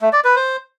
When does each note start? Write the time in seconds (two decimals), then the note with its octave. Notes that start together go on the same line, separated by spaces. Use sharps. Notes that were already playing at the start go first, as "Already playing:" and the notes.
0.01 A3
0.13 D5
0.24 B4
0.36 C5